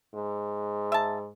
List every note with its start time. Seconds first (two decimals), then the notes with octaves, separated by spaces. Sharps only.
0.14 G#2
0.92 E5 A5